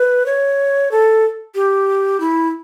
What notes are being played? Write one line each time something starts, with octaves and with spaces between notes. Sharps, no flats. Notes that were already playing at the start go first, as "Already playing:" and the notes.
Already playing: B4
C#5
A4
G4
E4